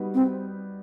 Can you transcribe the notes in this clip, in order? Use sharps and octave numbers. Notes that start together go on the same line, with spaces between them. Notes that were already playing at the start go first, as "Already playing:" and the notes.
Already playing: G3 B3 D#4 F#4 B4
C4